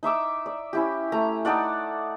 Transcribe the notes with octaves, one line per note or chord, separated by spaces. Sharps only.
D#4 E5 D6 E6
D5
C#4 E4 G4
A3 A#5
D#4 A4 D5 F#5